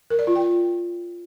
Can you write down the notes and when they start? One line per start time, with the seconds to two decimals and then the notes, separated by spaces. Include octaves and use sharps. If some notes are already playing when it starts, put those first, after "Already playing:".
0.10 A#4
0.19 D5
0.27 F4
0.36 G5